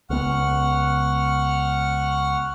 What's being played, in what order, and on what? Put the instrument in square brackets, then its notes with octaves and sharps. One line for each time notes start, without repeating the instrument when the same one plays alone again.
[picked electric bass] C#2 B3 [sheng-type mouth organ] F#5 C#6 F6